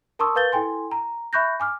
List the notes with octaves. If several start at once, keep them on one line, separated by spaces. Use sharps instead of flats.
A#4 A5 C6 C#6 D#6 E6
A#4 B4 F5 G6 A6 G7
E4 A4 G5 G#5 C6
A#5
E5 B5 C#6 F#6 G6 A#6
G#5 D6 F6